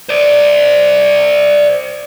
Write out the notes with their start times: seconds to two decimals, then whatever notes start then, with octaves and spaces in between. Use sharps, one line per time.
0.09 C5 D5